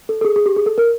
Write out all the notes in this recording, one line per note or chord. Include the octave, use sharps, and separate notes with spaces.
A4
A4
G#4
G#4
G4
G#4
A4
A#4